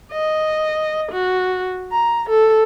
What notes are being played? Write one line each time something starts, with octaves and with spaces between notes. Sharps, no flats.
D#5
F#4
A#5
A4